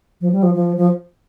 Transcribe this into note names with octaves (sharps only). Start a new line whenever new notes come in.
F3
G3
F3
F3
F3